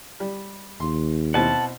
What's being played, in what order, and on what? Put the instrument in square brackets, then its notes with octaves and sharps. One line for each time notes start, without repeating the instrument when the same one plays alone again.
[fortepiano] G3
[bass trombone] D#2 [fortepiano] C6
[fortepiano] B2 C4 E4 [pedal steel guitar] F#5 A5